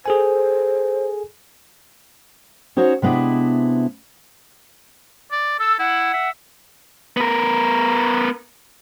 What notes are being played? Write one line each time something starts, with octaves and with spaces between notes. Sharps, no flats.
G#4 A4 C5 G#5
C#4 D#4 F#4 C5 C#5
C3 G#3 B3 D4 E4
D5
A4 E6
E4 F#5
E5
B3 A#4